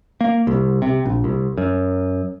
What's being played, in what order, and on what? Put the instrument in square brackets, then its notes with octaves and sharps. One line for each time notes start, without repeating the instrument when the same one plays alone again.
[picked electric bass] A#3
C2
C3
A#1
C2
F#2